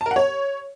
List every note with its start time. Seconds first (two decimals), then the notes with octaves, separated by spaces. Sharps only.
0.01 A5
0.06 A#4
0.11 F#5
0.16 C#5